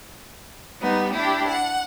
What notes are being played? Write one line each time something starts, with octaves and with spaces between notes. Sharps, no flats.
G3 B3 D#4
D4 E4 G4
F#5